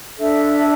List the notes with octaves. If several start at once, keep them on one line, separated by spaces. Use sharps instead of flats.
D4 A4 E5